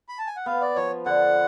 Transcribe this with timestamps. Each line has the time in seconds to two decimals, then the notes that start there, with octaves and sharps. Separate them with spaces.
0.09 B5
0.18 A5
0.27 G#5
0.36 F#5
0.46 B3 F5
0.61 D5
0.76 F3 C#5
1.06 D3 F#5